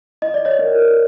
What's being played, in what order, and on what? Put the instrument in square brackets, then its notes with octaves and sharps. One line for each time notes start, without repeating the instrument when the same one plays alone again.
[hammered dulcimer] F4 [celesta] D#5
[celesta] D5
C#5 D#5
[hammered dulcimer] A#4